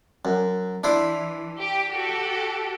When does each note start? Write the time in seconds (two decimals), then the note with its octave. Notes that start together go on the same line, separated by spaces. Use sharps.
0.25 F#2
0.84 E3 D4 E4 C5
1.59 G4
1.90 F#4 G4 A4